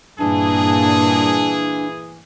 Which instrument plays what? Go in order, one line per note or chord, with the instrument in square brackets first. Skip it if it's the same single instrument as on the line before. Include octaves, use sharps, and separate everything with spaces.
[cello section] G2 A#2 A#3 [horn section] E3 G#4 [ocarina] D4 [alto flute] A5